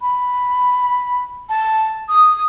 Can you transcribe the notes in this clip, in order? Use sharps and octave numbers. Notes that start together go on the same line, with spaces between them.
B5
A5
D#6